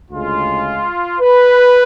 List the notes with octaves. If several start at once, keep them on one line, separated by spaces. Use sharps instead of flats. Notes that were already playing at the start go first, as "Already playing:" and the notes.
D2 C#3 G#3 F4
B4